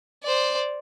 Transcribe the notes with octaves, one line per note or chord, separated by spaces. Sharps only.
C5 D5